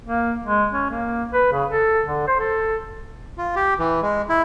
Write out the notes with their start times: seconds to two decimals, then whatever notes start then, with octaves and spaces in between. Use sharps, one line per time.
0.06 A#3
0.45 G#3
0.72 C#4
0.90 A#3
1.33 B4
1.52 C#3
1.70 A4
2.05 D3
2.27 C5
2.40 A4
3.38 F4
3.56 G4
3.79 E3
4.02 G#3
4.29 E4